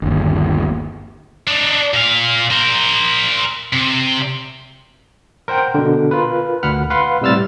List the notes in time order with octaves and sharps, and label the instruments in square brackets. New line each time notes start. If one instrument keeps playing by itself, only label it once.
[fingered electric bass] G1 D#2
[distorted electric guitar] D4 D#4
A#2 F5
A#4 C5
C3
[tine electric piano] A#4 C5 F#5 G5
B2 D3
F4 A#4 B4
D2 F#5 B5 F6
B4 F5 F#5 B5 C6
A2 C3 G3 E6 F6 A6